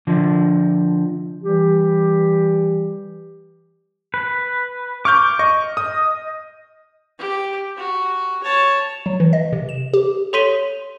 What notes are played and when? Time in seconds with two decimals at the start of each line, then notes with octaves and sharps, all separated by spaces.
0.07 D3 F3
1.43 E3 G3 G4
4.14 B4
5.05 C#6 D6 F6 G6
5.39 D#5 C#6
5.77 D#6
7.18 G4
7.77 F#4
8.43 C#5 A5
9.06 F#3
9.20 E3
9.33 D#5
9.53 C3
9.69 E7
9.93 G4
10.33 A4 C#5 C6 B6 D#7 G7